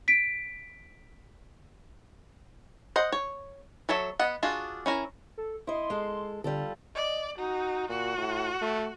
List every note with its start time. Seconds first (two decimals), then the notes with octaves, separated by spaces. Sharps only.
0.08 B6 D7
2.96 C5 D#5 F#5
3.12 C#5
3.89 F#3 A4 C#5 E5
4.19 B3 D#5 F#5
4.43 D4 F4 F#4 G#4
4.86 C#4 E4 A#4
5.38 A4
5.67 E4 D#5 C6
5.90 G#3 A4
6.44 D3 G3 F4 A4
6.95 D5 D#5
7.38 D#4 F#4
7.89 A#2 F#4
8.17 A2
8.61 A3